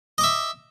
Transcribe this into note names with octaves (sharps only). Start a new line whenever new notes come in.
D#5 E5 D6